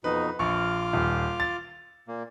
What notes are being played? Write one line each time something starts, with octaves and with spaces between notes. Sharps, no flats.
F2 B2 D#4 B4
A#1 F4 C#6 D6 F6
D#1
A6
A#2 A#3